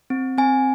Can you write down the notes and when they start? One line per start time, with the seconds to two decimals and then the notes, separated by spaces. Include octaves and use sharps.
0.10 C4
0.38 C4 G#5